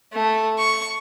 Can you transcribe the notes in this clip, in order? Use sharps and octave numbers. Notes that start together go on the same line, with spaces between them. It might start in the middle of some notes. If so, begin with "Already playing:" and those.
A3
C#6